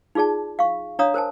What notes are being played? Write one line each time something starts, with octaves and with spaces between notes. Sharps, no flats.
D#4 F4 G#4 D5 A5
F5 C#6
D4 C#5 F5 A#5 D#6
A#4 C5 G#5 A5